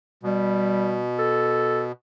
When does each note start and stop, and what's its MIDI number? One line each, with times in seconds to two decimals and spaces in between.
0.23 1.92 47
0.23 1.04 55
1.19 1.83 69